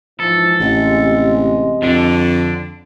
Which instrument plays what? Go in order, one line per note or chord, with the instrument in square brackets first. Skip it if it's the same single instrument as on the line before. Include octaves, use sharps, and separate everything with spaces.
[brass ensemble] G#2 E3 F3 [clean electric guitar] A4
[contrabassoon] A1 [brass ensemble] C3 G#3 D#5
[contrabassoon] F2 [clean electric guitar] D3 D4